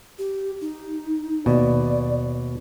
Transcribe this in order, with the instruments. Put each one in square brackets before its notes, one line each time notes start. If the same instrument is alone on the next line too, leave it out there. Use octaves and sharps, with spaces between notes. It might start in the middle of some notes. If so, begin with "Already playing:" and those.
[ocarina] G4
D#4
[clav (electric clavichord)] D#2 B2 [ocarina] D5